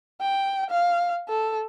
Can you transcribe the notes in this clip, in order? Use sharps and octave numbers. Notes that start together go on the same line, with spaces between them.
G5
F5
A4